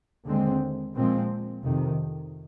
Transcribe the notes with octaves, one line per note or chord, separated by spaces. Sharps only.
D#2 D3 G#3 C4
A#2 F3 G#3 C4
F2 C3 D#3